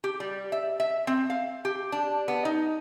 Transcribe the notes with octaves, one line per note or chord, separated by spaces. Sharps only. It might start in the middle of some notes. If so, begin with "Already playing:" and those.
G4
G3
E5
E5
C4
F5
G4
D4
B3
D#4